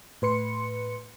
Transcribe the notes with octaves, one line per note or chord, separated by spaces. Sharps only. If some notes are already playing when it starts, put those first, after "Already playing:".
A2 B4 C6 C#7